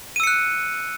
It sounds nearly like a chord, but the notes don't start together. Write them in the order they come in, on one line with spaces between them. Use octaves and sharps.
D#7 E6 C#7 F#6